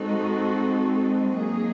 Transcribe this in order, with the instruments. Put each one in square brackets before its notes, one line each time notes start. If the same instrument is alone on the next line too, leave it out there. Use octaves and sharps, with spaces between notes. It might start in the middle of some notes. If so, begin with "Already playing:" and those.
Already playing: [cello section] G#3 C4 D#4 F#4 A4
F#3 A#3 D#4 G#4